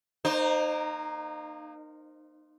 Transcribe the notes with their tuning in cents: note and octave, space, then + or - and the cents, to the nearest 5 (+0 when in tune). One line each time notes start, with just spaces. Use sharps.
A#3 +0 D#4 -30 C5 +5